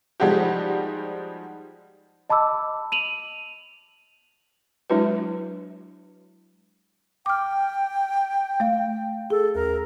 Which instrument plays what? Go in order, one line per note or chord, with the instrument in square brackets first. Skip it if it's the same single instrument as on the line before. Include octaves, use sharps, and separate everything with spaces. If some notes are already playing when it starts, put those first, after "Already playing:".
[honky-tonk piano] F3 G3 G#3 D#4 F#4 G4
[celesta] D#5 A5 B5 D6 E6
D#7 F7 F#7
[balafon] F#3 G#3 D4 E4 F#4 B4
[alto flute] G5 [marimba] D6 F6
[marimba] A3 F5
[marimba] G#4 [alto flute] A4
[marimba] D#2 [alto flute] A#4